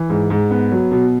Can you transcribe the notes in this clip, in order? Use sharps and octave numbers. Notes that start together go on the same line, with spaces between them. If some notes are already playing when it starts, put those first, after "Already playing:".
Already playing: E3
G#2
G#2
B3
F#3
B2